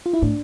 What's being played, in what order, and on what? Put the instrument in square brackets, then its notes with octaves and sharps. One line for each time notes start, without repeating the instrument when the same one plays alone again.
[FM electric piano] F4
E4
[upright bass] A2 [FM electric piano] D4